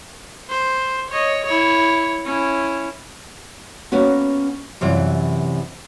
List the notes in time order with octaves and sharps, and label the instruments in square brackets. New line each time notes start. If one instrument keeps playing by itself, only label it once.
[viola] C5
C#5 D#5
E4 C#5
C#4 E4
[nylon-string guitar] A#3 B3 C#4 F#4
F#2 C3 E3 F4 D5